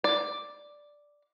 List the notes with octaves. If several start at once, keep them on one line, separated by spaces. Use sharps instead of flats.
D5